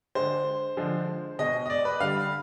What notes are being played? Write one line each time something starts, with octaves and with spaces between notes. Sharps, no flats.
D3 G#3 C5
D3 F3 G#3
B2 G#3 D#5
D#5
D5
B4
D3 G3 F5